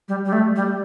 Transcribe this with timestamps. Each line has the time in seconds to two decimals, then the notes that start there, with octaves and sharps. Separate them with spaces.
0.08 G3
0.25 G3
0.32 A3
0.56 G3